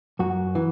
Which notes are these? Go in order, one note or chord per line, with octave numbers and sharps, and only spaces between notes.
F#2 F#4
E3